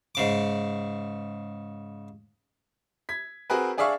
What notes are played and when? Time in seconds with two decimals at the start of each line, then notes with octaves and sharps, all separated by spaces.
0.15 G#2 C#3 D6
3.09 G#6 B6
3.50 C4 F#4 G#4 A#4 B4
3.77 D4 G#4 D5 E5 F5 C#6